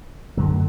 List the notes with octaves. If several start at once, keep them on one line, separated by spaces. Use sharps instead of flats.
F#2 D3 F#3 A3